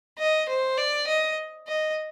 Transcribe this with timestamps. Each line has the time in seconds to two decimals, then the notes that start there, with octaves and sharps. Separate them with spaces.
0.19 D#5
0.49 C5
0.78 D5
1.07 D#5
1.68 D#5